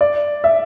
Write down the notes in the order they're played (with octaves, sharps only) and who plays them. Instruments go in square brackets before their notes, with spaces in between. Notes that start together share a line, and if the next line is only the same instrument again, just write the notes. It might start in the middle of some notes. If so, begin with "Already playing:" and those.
[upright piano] D5
E5